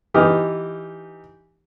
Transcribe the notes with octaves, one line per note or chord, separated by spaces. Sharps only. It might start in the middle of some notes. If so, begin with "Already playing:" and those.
E3 D#4 G4 D#6 F6